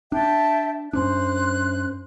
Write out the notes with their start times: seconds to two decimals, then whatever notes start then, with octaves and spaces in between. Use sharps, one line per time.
0.12 D4 E5 G5 A5
0.93 F#2 C#4 D4 C5 F#6